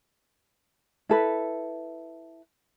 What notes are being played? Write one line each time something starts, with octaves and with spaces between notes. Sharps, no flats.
E4 A4 B4